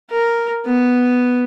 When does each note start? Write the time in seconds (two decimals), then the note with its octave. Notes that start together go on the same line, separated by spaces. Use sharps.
0.11 A#4
0.66 B3